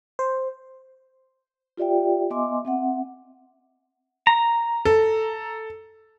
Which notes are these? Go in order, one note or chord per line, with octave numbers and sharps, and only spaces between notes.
C5
F4 G4 D5 E5 G5
B3 D#5 E5 G#5 C6 D6
C4 E5 F#5
A#5
A4